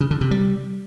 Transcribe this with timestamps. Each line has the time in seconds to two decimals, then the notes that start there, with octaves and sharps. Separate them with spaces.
0.01 C#3
0.11 D3
0.21 C3
0.31 G3